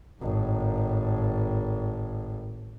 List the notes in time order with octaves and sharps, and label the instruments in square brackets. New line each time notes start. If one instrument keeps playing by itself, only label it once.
[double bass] G#1 A2